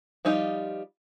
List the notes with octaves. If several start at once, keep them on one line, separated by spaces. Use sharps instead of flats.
F3 G3 D#4 F4